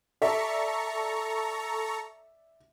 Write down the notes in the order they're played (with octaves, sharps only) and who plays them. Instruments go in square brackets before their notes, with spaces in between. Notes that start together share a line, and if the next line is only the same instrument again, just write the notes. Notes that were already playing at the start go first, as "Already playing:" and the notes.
[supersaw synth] A4 A#5 C#6 [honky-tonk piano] D5 E5